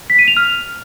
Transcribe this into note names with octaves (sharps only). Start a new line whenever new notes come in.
B6
D#7
F7
F6